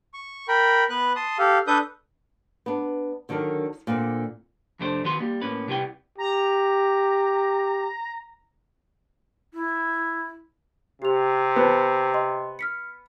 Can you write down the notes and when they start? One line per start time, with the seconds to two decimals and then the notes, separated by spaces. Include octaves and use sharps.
0.14 C#6
0.48 A#4 G5 B5
0.90 B3 B4 F#6
1.16 A5 C6 D#6
1.38 G4 A4 F5
1.67 D4 A4 B4 D#6 G6
2.66 B3 D4
3.29 D3 D#3 F#3 D4 A#4
3.87 A#2 D3 C4
4.79 F2 C3 A3 D4 F4 C5
5.04 D#3 B3 F#4 C6
5.20 G3 A#3
5.41 A2 A#3 C#4 B4
5.67 C3 G3 B3 E4 G5
6.18 G4 A#5
9.54 E4
11.02 C3 G4 F7
11.56 B3 C5 A5
12.14 D#5 C6
12.59 F6 B6 C#7